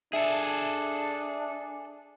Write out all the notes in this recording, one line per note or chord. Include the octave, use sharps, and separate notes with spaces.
D4 G#4 A4 E5